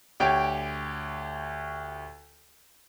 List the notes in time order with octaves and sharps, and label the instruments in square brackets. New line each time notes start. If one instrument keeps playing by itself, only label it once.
[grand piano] D2 G4 C#5 G5 D7